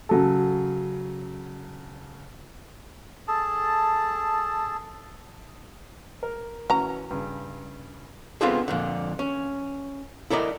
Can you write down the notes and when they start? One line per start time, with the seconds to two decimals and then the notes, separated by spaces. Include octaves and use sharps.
0.09 C#3 F#3 A4
3.28 G#4 A4 A5
6.23 A#4
6.70 E3 C#4 F#4 A#5
7.11 G2 C#3
8.41 B3 C4 D4 F4 G#4 A4
8.68 F2 A#2 D3
9.19 C#4
10.30 E4 A4 A#4 D5 D#5